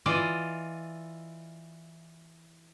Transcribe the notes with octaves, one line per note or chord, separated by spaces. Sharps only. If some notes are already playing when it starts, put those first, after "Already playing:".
E3 F4 D5 D#5